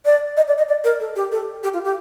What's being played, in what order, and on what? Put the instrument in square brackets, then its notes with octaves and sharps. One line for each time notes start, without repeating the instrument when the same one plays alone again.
[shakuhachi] D5
D#5
D5
D#5
D5
A#4
A4
G4
A4
G4
F4
G4